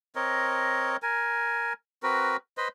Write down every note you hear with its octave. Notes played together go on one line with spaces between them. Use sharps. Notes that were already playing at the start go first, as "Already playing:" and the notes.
C4 A#4 C#5 D#5
A#4 G#5
C4 F#4 A#4 B4
B4 C5 D#5